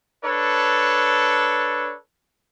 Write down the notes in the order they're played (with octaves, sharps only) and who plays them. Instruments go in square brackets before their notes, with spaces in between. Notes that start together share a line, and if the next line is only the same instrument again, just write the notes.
[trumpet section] D4 A4 B4 C#5